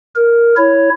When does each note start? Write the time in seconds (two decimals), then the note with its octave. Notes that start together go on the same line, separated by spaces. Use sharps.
0.15 A#4
0.57 E4 C#5